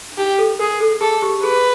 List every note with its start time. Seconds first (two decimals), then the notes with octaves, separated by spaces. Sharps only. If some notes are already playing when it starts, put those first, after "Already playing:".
0.12 D4
0.17 D#4 G4
0.38 A4
0.59 G#4 A#4
0.81 A4
1.01 G#4 A4
1.22 G4
1.43 G#4 B4